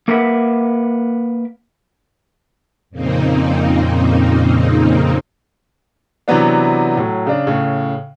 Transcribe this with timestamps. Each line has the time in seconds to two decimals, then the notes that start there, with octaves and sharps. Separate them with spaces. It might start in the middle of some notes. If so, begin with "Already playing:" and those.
0.08 A#3 A#4 B4 E5 F#5
2.90 F2 A#2 C#3 A#3 C4 D#4
6.28 C3 E3 F#3 B3 D4
6.97 A2 F#3
7.27 C#3 D4
7.47 A2 C#3